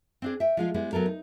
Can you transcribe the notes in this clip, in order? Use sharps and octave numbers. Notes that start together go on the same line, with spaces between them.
C4 D4 G#4
E5 G5
F3 G#3 F4
G3 G#3 B3 E4
F#3 B3 A4 A#4
D#4